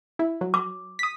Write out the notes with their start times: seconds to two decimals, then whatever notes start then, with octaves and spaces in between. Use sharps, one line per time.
0.19 E4
0.41 F#3
0.54 D6
0.99 D#6 B6